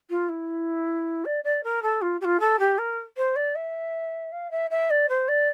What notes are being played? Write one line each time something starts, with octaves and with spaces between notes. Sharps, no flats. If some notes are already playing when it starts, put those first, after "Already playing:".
F4
E4
D5
D5
A#4
A4
F4
G4
F4
A4
G4
A#4
C5
D5
E5
F5
E5
E5
D5
C5
D5